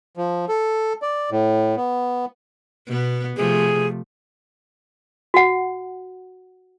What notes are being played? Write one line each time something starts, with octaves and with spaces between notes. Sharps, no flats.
F3
A4
D5
A2
B3
B2 B3
C3 F3 A3 G#4
F#4 F#5